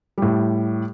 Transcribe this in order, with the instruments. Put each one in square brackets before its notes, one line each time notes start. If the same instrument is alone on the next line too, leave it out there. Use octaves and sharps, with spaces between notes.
[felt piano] A2 G3